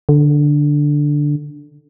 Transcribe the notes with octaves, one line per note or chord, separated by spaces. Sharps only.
D3